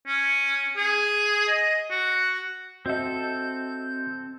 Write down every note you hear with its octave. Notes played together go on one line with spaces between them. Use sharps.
C#4
G#4
D#5
F#4
C4 F#4 A4 D#5 E5 G6